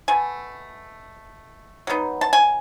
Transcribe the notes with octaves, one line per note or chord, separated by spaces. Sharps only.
B2 A3 G#5
F#3 B3 D#4
A5
G#5